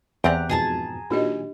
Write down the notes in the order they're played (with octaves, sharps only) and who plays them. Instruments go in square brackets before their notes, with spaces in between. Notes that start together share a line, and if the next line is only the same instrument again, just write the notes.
[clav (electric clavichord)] E2 C4 D5 [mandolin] G4 A#5 F#6
[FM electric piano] F2 G#2 B2 [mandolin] G#4 A5 A#5
[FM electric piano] A#2 D#3 F#3 [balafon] D4 G4 D#5